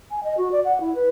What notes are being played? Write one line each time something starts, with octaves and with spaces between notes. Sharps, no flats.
G#5
D#5
F#4
D5
F#5
E4
B4